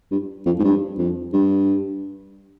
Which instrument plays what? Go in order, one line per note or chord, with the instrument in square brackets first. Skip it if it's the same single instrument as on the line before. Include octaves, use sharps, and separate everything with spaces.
[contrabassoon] G2
F2
G#2
G2
F2
G2